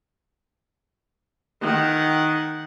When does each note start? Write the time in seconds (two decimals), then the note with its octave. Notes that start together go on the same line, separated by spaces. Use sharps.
1.62 D#3 F#5